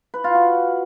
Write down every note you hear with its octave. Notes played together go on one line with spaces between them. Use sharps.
B4
F4
F#4